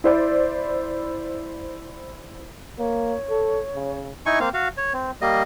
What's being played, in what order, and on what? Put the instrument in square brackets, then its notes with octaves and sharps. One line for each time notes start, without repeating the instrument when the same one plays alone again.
[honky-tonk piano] E4 C5 D5
[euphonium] A#3 [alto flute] C#5
[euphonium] A4
C#3
[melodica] D#4 E4 G#5 C#6
A#3 C4 F5
F#4 F5
C#5
C4
G3 A#3 D#5